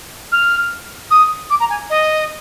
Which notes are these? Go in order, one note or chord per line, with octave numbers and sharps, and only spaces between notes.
F6
D#6
D6
A#5
G#5
D#5